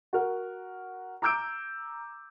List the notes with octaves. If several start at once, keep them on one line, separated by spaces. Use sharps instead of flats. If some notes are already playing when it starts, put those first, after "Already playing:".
F#4 A#4 F#5
A#5 D6 E6 G6 D7